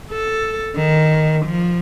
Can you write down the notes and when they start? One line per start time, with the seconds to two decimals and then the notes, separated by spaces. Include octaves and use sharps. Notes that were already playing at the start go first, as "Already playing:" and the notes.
0.11 A4
0.76 D#3
1.46 F3